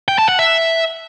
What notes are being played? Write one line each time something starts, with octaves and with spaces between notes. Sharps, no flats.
G5
A5
F#5
E5